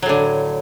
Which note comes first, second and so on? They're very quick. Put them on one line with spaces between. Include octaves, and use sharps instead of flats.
F#3 A2 D3